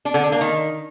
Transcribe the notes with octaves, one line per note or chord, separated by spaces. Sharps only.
D4
D3
D4
A#3
D#3